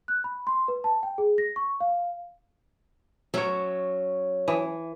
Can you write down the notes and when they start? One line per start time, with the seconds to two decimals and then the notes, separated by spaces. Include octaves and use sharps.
0.08 F#6
0.24 B5
0.47 C6
0.68 B4
0.84 A5
1.03 G5
1.18 G#4
1.38 A#6
1.56 C#6
1.80 F5
3.34 F#3 C#4 C#5 E5
4.48 E3